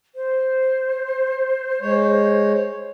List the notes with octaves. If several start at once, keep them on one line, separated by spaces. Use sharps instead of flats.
C5
G#3 C#5